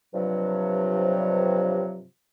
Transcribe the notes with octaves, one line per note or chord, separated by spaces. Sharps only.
G2 C3 F3 F#3